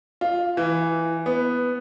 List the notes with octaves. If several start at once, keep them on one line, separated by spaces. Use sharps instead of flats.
F4
E3
B3